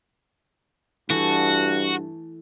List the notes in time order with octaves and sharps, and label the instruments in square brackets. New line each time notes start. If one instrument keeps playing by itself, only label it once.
[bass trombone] G2 [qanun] E3 A3 A4 [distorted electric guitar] F#4